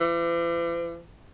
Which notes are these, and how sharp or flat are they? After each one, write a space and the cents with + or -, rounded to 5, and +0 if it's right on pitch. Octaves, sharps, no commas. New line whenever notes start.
E3 +45